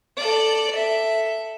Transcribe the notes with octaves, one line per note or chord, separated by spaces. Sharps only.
A4 D5
A4 E5